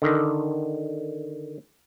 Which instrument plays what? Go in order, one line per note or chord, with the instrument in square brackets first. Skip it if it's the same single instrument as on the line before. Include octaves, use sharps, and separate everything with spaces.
[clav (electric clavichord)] D3 D#3